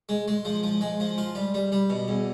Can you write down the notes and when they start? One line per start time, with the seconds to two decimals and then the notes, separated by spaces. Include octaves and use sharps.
0.09 G#3
0.28 G#3
0.45 F3
0.63 F3
0.81 G#3
1.00 F3
1.18 F4
1.35 G3
1.54 G3
1.72 G3
1.90 B2
2.08 E2